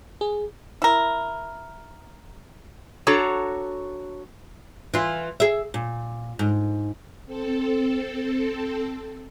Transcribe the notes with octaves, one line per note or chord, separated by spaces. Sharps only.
G#4
E4 A#4
D4 F#4 A4 C#5 A#5
E3 F4
G#4 E5
A#2
G#2
C4 A4